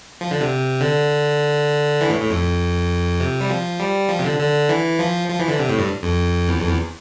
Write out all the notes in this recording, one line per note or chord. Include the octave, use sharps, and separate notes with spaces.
F3
D3
C3
D3
E3
A2
A2
F2
C3
G3
F3
G3
F3
C3
D3
D3
E3
F3
F3
E3
D3
C3
A2
G2
F2
E2
F2
E2